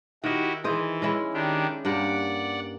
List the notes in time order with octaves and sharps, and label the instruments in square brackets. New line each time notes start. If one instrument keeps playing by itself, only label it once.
[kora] D#3 D#5 [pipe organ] E4 F#4 G4
[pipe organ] E3 [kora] G#4 C5 D#5
[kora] G#3 C#4 E4
[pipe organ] D#3 D4 G4
[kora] G2 A#3 G4 [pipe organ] D5 F#5